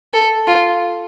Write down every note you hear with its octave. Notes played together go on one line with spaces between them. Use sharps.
A4
F4